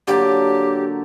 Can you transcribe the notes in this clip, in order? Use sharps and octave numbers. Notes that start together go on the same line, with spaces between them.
D3 F#3 A#3 G4